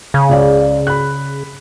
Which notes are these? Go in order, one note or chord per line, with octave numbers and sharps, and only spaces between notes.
C#3
C#2 D5 F5
B5 F#6